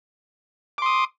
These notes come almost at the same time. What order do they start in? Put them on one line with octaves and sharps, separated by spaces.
D6 C6 D#6